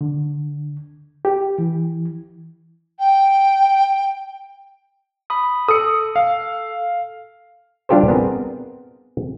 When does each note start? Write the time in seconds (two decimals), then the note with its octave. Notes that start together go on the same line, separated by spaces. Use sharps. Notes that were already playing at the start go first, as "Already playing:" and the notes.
0.01 D3
1.25 G4
1.58 E3
2.99 G5
5.30 B5 D#6
5.68 A4 D#6 C#7
6.16 F5
7.89 G3 D4 F4 G4 A4 C5
8.08 B3 C4 G#4 A#4